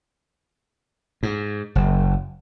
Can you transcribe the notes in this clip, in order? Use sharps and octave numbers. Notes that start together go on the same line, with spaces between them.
G#2
F#1